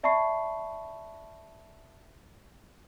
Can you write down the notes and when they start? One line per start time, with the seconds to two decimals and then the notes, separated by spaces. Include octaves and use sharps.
0.03 D5 E5 A5 B5 C#6 C7